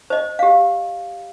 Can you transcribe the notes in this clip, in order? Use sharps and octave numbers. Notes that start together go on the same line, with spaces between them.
C5 D#5
G4 F5